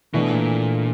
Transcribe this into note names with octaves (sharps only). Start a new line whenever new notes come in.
B2 E3 A3 D4
A#2